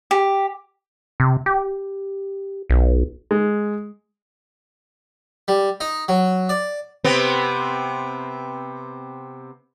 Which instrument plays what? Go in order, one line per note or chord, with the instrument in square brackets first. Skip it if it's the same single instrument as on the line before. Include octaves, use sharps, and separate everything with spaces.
[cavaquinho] G4
[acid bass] C3
G4
B1
[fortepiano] G#3
[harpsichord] G3
D#4
F#3
D5
[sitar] C3 B3 C4